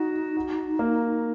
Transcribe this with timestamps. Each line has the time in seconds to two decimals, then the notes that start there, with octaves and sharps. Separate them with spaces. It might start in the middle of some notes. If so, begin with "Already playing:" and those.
Already playing: D#4 F#4
0.37 F#4
0.79 A#3